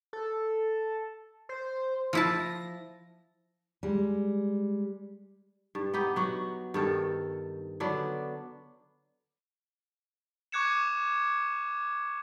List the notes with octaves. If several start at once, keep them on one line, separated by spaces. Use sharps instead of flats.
A4
C5
F3 E4 A5 A#6
G3 G#3
G2
B3 D#4 G4
F#3 F#4
G2 D#3 A4
D3 F#3 B3 D4
C#6 D6 F#6 G#6 C#7 E7